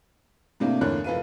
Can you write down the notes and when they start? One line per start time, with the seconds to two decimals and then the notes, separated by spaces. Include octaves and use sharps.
0.60 A2 C3 A#3 D4 E4
0.81 E2 A2 D3 A#4 C#5 F#6
1.04 F1 B4 F5 D#7